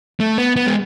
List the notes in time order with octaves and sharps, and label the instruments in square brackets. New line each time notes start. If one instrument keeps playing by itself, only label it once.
[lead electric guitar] A3
B3
B3
G#3